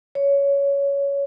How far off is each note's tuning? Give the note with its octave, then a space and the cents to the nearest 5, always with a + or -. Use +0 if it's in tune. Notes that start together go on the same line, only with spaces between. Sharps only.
C#5 +15